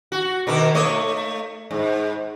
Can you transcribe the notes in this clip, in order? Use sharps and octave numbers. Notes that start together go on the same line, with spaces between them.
F#4
B2 D#3 A#4
A3 C#5 D#5
G#2